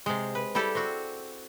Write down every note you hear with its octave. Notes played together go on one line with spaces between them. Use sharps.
C3 G#3
B4
G3 E4 G4 A4 D5
C4 F#4